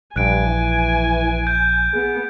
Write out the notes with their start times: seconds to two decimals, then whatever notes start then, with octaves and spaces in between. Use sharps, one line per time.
0.16 A#1 G2 G#5 F#6 D7
0.46 E3
1.47 G6
1.94 B3 G#4